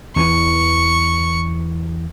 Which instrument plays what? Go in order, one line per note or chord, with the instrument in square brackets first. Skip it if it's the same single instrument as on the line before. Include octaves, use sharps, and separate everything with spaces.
[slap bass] E2 E3 [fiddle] C#6